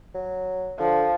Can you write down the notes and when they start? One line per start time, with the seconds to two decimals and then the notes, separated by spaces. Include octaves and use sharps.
0.15 F#3
0.80 D3 F3